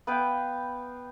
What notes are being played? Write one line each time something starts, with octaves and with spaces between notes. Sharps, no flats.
B3 B4 F5 G5